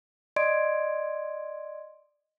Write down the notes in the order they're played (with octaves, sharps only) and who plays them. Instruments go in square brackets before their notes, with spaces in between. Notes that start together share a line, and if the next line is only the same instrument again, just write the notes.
[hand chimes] D5 D#5 C6 G#6 D7